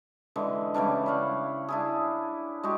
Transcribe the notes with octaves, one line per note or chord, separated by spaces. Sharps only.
D3 E3 G#3
C#3 E3 G3 D4
E4 C#5 F5 F#5
D4 E4 G#4
G#3 F#4 G4